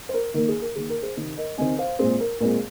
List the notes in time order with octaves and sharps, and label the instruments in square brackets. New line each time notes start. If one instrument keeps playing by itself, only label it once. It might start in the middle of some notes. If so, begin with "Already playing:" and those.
[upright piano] C5
A#4
D#3 A#3 A#4
G#4
A#4
D#3 A#3 G#4
A#4
G#4 C5
C3 D#3 C4
A#4 D#5
C3 D#3 C4 D#5 G#5
C5 F5
A#2 G#3 C4 G#4 C5
A#4
A#2 G#3 C4 A#4